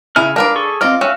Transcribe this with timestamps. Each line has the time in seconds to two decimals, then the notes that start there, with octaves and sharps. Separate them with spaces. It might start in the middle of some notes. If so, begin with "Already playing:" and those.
0.16 C#3 E4 G#5 F6
0.36 D4 A#4 B4 D5 F5
0.55 G#4 A4 C#6
0.81 C4 F4 D5 D#5 F6
1.01 C#4 F#4 E5 F5